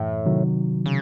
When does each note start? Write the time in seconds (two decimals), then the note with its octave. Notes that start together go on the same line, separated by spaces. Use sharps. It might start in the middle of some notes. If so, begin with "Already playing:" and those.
Already playing: F#2 A2 E3
0.26 C3 D#3 F#3
0.86 C#3